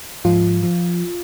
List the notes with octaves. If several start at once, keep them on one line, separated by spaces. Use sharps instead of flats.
G#2 F3 F4
F3